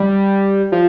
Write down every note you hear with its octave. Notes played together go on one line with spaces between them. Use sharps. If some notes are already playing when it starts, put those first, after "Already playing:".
Already playing: G3
F3